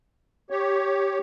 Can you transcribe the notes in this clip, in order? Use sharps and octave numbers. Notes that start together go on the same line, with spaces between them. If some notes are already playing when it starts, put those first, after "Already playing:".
G4 C#5